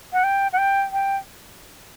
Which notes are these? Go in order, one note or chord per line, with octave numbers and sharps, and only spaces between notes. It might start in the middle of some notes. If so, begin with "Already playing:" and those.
F#5
G5
F#5
G5
G5